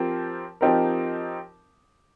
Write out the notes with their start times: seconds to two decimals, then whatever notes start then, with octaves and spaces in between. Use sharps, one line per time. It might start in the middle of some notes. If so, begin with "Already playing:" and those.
Already playing: F3 C4 G4 A#4
0.61 F3 C4 D#4 G4 A#4